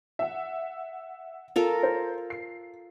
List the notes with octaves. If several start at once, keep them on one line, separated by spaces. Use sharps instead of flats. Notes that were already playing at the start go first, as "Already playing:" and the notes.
E5 F#5
F4 A4 A#4
C5
C7